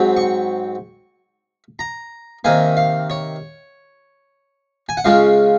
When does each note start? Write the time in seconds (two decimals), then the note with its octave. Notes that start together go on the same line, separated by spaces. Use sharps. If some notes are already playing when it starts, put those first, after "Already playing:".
Already playing: G#2 F#3 C4
0.17 C#6
1.79 A#5
2.45 C3 D#3 A#3 G#5
2.77 F5
3.10 C#5
4.89 G#5
4.97 F#5
5.05 C#3 G#3 C#4 F4 F5